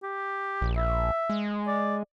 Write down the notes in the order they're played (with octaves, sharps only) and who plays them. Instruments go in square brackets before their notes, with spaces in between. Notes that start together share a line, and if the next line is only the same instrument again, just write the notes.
[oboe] G4
[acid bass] A#1
[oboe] E5
[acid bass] G#3
[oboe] D5